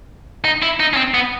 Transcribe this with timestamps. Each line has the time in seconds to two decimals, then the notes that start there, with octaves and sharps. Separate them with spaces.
0.45 D#4
0.62 E4
0.80 D#4
0.93 C#4
0.97 C4
1.14 B3